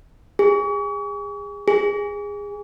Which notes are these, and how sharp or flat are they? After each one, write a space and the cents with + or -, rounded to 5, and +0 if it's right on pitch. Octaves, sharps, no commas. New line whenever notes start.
G#4 -30
G#4 -20